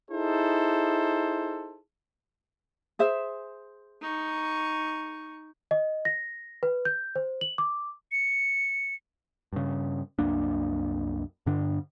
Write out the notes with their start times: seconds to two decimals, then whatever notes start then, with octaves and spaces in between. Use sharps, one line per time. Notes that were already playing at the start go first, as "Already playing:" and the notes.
0.11 D#4 E4 G#4 A4 C5
2.99 G#4 C5 E5
4.01 D#4 C#6
5.71 D#5
6.05 A#6
6.63 B4
6.85 G6
7.16 C5
7.41 F#7
7.58 D6
8.12 C#7
9.53 G2 C#3
10.19 C2 F#2 A#3 D4
11.46 G2 D3 D4